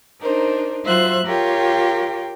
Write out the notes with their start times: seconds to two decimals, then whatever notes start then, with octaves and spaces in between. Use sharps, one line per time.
0.22 D4 D#4 A#4 C5
0.85 F#3 F4 C5 E5 F#6
1.25 F4 G4 A#4 C#5 G5